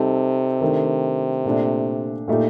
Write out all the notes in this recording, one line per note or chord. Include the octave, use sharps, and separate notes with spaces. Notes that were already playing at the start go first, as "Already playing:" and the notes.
Already playing: C3 G3 C4 D#4 A4
D#3 A3 D4
A#2 A3 D4
A#2 A3 D#4 G4